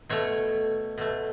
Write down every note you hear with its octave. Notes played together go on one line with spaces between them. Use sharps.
B2 A3 C#5
B2 A3